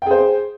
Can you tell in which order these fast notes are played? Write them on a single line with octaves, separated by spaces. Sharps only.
G5 G#4 C5